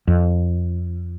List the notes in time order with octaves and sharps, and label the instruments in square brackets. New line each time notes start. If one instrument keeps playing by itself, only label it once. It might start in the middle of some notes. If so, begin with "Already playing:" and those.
[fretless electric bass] F2